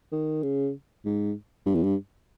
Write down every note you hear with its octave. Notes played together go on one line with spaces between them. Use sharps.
D#3
C#3
G#2
G2
E2
G2